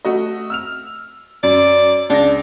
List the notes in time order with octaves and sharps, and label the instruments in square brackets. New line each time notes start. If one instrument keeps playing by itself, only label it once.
[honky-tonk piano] A3 F#4 D#5
E6 F6 F7
[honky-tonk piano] F#2 [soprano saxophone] D5
[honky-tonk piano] C#2 A#6 [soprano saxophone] D4